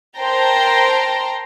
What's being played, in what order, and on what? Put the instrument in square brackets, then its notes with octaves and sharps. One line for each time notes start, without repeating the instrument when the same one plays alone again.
[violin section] A#4 C5 G5 A5 A#5 C6